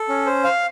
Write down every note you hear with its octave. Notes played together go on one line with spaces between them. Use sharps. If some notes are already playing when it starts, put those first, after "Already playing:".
Already playing: A4
C#4
C5
F5